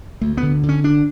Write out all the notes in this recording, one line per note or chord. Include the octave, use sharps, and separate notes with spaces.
D2 A3
B3
D3
D3
C#4
D3 D4